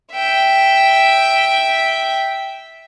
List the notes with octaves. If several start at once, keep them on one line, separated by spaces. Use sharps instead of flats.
E5 G5